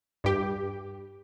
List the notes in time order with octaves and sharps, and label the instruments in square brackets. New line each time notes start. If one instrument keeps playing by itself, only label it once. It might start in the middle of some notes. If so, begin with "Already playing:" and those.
[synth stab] G2 G4